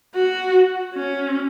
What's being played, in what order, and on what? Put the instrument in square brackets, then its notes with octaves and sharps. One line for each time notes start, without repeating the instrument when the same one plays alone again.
[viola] F#4
C#4